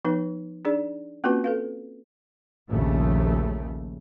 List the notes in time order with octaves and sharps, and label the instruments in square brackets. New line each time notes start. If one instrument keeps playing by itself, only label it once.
[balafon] F3 B3 D#4 B4
D4 D#4 G#4 D5
A#3 C4 C#4 F4 F#4 B4
A4 B4 F5
[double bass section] A#1 D#2 C#3 A3